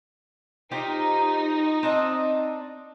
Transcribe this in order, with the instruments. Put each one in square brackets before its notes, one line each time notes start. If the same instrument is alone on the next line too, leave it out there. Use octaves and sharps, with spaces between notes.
[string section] D#4 [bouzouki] F4 G4 C5
[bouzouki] C4 D4 D#5